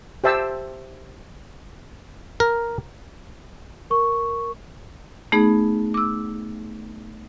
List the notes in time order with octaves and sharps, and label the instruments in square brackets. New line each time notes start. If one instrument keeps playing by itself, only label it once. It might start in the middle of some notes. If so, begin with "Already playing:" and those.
[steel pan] G4 C5 E5 A5 E6
[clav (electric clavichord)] A#4
[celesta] A#4 C#6
[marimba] A3 B3 D#4 G#4 B5
D6 E6